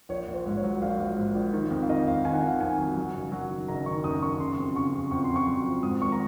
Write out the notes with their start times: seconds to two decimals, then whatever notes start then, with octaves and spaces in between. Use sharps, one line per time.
0.09 A#1 C#5
0.28 A#1
0.34 C5
0.46 G#2
0.57 C#5
0.64 F#3
0.81 A#1 F5
0.99 A#1
1.17 G#2
1.35 A#1
1.53 D#3
1.71 F2
1.82 F5
1.89 D#3 D#5
2.07 F2 F5
2.24 D#3 G#5
2.33 F#5
2.40 F5
2.43 D#3 F#5
2.61 F2 G#5
2.78 F#3
2.97 F#3
3.14 F#1
3.32 F#3
3.50 D#3
3.68 F#1 A#5
3.86 D#3 C#6
4.04 F#2 D#6
4.22 F#2 C#6
4.40 C#3 C6
4.57 F2
4.75 C#3 C#6
4.93 F2
5.11 F2 C#6
5.24 F2 C6
5.36 C#6
5.47 F#3
5.66 F2
5.83 G#2 D#6
6.01 G#1 C#6
6.12 A#5